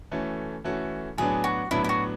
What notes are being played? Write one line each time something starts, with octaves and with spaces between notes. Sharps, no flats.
E3 A3 C#4 F#4 A4
E3 A3 C#4 F#4 A4
A2 F#3 B3 D4 G#4
F#4
A2 F#3 B3 D4 E4
E4
F#4